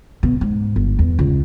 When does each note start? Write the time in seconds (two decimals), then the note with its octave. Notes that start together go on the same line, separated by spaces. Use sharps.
0.23 B2
0.41 G#2
0.76 G1
0.99 E2
1.19 C#2